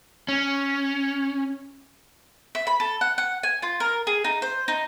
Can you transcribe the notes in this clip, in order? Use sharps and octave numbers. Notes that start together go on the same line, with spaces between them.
C#4
E5
B5
A4
F#5
F#5
G#5
F4
A#4
G#4
D#4
C5
D#4